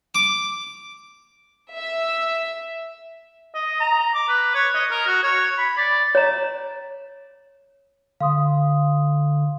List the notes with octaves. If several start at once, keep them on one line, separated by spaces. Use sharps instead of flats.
D6
E5
D#5
A#5
D6
B4
C#5
D#5
A#4
F#4
C#5
B5
D5
C#5 A#5
D3 F5 C6 D#6